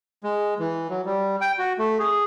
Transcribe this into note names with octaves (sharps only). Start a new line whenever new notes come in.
G#3
E3
F#3
G3
G5
F#4
A3
G#4